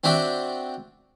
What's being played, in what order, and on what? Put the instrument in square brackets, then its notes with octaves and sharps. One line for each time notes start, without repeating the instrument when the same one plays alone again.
[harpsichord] C4 D4 F#4 E5 G5